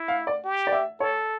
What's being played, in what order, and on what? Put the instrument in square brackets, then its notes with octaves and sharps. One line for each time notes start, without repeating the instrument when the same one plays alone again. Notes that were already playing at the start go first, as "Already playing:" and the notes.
Already playing: [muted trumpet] E4
[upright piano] F5
D5
[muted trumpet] G4
[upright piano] D5
E5
[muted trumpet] A4 [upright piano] C#5